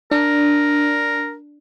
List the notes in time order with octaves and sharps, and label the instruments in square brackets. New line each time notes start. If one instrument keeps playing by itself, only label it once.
[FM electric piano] D4 [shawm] A#4